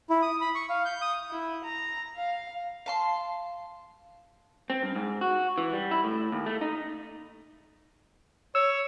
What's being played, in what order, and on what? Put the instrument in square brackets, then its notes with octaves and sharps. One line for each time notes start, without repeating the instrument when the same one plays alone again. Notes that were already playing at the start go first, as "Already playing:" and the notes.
[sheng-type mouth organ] E4
D#6
B5
C#6
F5
G6
D#6
[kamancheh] E4
A#5
F5
[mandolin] F5 A5 C6
[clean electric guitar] C4
G2
G#2
F#4
E3
G3
E4
A2
D#2
A3
D#4
[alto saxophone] C#5 [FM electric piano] E6